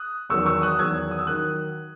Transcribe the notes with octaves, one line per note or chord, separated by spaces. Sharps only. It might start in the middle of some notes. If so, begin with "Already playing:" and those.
Already playing: D#6 F#6
E2 D#3 F#3 C#6 E6
C#6 E6
D#6 F#6
E2 D#3 F#3 E6 G#6
D#6
E6
D#3 F#3 D#6 F#6